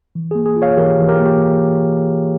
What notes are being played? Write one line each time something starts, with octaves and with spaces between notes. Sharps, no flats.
E3
A#3 G#4
G#4
F4
C#5 F5
E3 G4 A#4
E3
G4 A#4
A#3
G4